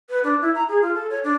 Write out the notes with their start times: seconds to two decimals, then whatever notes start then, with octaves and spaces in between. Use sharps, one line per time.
0.09 B4
0.24 D4
0.42 E4
0.55 A#5
0.69 G#4
0.82 F4
0.95 A4
1.10 C#5
1.24 D4